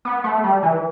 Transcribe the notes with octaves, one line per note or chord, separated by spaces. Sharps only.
B3
A3
G3
E3